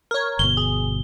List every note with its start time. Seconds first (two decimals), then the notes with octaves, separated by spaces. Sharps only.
0.11 A#4 C#5
0.39 G1 B2 G7
0.57 G#4